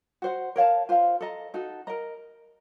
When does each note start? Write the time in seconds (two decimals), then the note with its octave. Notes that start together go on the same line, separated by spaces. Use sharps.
0.22 F#4 C5 F#5
0.56 A#4 C#5 F5 A5
0.89 F4 C5 F5
1.21 A4 D#5 A#5
1.54 D#4 F#4 A4
1.87 A#4 D#5 A#5